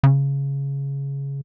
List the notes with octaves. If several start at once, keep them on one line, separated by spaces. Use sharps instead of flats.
C#3